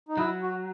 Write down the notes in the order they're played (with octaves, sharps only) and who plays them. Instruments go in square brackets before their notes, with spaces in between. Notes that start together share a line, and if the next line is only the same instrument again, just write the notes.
[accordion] D#4
[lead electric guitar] F#3 [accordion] E4
[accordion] F#4